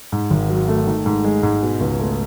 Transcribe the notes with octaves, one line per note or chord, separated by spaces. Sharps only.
G#2
G#1
F#3
A3
D#3
G#2
G#3
G#2
B2
C#2
A3